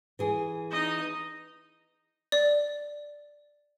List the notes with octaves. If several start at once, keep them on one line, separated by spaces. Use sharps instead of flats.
E3 G#4
D#4 D#5
D5